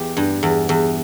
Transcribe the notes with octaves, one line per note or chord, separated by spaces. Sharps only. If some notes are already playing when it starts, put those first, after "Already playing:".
Already playing: E2 G4
G2
E2
E2